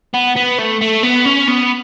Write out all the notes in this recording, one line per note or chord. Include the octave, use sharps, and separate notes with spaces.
B3
B3
A3
A3
B3
C#4
B3